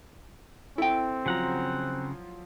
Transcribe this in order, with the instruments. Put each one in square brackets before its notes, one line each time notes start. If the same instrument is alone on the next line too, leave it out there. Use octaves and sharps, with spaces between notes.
[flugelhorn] C4 [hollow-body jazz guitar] E4 G5 [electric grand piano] A4
[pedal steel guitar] C#3 F#5 A#5 [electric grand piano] F3 F#3 F4